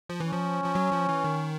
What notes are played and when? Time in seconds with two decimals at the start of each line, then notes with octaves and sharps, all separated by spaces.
0.09 F3
0.20 E3
0.26 C#4
0.32 F3
0.64 F3
0.75 F#3
0.91 F3
1.09 E3
1.24 D#3